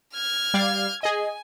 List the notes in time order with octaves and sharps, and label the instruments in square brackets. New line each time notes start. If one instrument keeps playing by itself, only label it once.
[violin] F6 G#6
[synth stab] G3 D5 F5
[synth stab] G#4 D#5 [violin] G#5